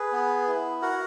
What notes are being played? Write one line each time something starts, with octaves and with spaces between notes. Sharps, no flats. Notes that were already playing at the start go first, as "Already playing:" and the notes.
Already playing: G#4 B4
B3
E4
F#4 A#4 F#5